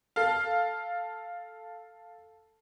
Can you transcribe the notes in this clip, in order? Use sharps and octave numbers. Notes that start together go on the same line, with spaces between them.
A4 F5